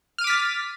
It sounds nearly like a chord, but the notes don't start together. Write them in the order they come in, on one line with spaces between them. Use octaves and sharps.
F6 D#7 D6 B6 A6